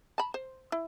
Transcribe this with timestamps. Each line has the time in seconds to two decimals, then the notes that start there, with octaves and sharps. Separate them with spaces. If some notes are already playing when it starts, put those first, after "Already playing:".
0.18 A5 B5
0.34 C5
0.72 E4